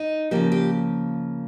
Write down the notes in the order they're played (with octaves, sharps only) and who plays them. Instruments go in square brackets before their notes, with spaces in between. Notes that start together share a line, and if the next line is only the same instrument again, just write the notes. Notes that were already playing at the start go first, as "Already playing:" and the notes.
Already playing: [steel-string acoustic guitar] D#4
C#3 F3 A#3 G4
G4